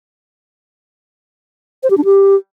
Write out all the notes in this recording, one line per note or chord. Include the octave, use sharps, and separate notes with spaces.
C5
G4
D4
G4